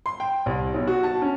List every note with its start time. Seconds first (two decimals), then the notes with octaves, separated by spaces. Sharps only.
0.06 C6
0.20 G5
0.46 C2
0.74 B1
0.88 F#4
1.03 A5
1.22 C#4